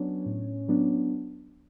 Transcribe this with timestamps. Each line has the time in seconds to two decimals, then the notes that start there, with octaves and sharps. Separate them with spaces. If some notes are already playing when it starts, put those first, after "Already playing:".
Already playing: F#3 B3 C#4 D4 C#5
0.26 A2
0.68 F#3 B3 D4